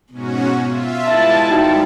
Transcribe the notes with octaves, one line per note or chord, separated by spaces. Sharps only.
G#2 B2 C#4 F#4
F4 E5
G3 G#3 E4 F4 B4 E5 A5
G#2 D#3 G3 D#4 F#4 G5